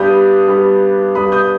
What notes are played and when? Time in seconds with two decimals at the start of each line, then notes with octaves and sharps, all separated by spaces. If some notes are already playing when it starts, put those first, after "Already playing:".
Already playing: G2 G3 B3 D#6 G6
0.48 G2 G3 B3
1.15 G2 G3 B3 B5 D#6
1.32 D#6 G6